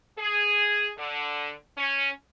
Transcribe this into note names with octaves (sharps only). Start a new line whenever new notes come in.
G#4
D3
C#4